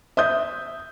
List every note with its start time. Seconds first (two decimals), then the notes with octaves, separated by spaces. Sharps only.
0.17 E5 D#6 G6